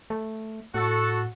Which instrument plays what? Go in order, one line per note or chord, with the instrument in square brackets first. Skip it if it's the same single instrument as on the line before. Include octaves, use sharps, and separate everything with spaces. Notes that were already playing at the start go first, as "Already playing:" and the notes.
[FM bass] A3
[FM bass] A2 [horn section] F#4 A4